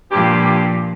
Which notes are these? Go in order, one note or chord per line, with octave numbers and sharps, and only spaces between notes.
G2 A#2 F3 G4